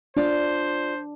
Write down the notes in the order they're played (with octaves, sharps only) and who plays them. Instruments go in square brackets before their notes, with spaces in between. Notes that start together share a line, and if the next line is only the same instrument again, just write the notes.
[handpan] D4 [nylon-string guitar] F4 D5 [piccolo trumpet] C5